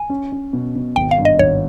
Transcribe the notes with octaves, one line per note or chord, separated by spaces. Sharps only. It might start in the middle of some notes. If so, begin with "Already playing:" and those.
Already playing: G#5
C#4
C#4
B2
B2
G#1 G5
F5
G2
D#5
G#1 C#5